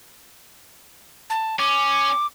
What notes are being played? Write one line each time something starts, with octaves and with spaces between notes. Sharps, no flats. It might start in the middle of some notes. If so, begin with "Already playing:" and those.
A5
C#4 D6